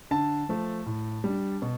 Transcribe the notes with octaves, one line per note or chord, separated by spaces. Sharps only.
D3 A5
F3 A3
A2
G3 D4
B2